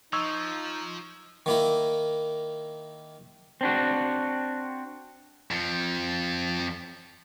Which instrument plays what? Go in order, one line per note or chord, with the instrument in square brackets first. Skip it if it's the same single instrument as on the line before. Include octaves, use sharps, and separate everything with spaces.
[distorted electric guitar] F3 [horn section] D#4 [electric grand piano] C#6 E6 G#6
[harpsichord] D#3 A#3 E4
[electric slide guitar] C4 D4 F#4
[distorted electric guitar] F2 F3